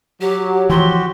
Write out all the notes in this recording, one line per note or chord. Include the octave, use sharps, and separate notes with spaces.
F#3 G4
E3 F3 F#4 G4 C6